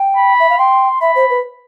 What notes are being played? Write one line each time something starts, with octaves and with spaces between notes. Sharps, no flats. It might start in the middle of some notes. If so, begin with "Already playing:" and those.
Already playing: G5
B5
E5
F5
G5 C6
E5 B5
C5
B4